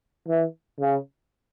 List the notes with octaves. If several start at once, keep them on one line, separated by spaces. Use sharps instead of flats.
E3
C#3